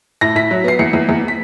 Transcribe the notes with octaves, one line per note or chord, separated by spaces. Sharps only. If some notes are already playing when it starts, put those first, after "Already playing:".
A2 A#6
A2 B6
F#3
B3 C7
E2 C#7
E2
E2
B6